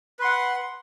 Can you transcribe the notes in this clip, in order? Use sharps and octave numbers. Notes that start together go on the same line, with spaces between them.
B4 F#5 C6